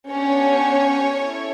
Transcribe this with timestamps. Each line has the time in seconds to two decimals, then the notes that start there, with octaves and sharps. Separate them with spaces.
0.10 B3 C#4 D4 G4 C#5
1.21 C#4 E4 A4